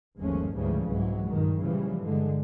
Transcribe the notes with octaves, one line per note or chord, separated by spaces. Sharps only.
G1 D#2 F3 G#3 A3 C#4
D2 G#2 C#3 E3 F3 G3
C2 G#2 E3 F#3 G#3
G2 A#2 D#3
A#2 C#3 E3 F3 G3
G2 D3 G#3